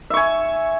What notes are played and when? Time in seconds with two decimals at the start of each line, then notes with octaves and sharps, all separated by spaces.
0.10 E5
0.14 C#6
0.17 G#5